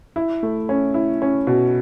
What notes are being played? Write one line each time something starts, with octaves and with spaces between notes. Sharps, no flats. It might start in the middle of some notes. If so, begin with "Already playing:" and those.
E4
A3
C#4
E4
C#4
B2